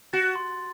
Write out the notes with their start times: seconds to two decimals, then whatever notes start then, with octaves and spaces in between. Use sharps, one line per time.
0.13 F#4 A6
0.36 C6